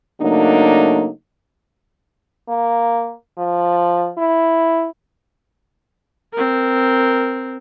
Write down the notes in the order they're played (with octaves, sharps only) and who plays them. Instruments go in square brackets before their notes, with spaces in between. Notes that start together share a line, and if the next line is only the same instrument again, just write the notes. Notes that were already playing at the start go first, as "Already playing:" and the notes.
[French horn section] C#3 F#3 A3 A#3 D4 D#4
[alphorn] A#3
F3
E4
[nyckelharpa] C4 A#4